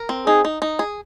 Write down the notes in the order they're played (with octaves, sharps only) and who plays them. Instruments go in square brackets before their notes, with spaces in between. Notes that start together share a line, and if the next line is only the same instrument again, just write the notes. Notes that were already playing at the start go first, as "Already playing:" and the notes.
Already playing: [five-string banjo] A#4
C4
[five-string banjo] D#4 [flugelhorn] G#4
[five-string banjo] D#4
D#4
G#4